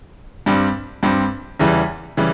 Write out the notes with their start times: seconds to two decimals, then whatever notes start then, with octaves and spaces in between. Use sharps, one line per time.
0.46 G2 G3 C4
1.03 G2 G3 C4
1.60 E2 C#3 E3 G3
2.17 C#3 E3 G3